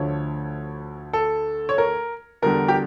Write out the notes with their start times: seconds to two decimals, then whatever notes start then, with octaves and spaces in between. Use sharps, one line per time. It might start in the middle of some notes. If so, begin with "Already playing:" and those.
Already playing: D2 D3 F3 A3 C#5
1.13 A4
1.69 C#5
1.78 A#4
2.42 E2 D3 G3 A#4
2.68 G4